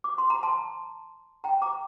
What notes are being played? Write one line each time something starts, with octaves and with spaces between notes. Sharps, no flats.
D6
C6
A#5
A5 C6
G5 A#5
A#5 D6